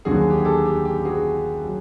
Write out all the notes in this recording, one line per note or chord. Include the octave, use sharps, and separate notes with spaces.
D#2 D3 F#3 F#4 G#4
G4
G#4
G4 A4
G4
G4
F#4 G#4
F#3